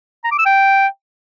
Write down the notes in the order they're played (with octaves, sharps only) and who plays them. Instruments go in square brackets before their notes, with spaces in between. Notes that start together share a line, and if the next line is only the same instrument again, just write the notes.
[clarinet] A#5
D6
E6
G5